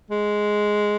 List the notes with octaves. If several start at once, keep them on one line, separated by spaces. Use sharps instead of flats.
G#3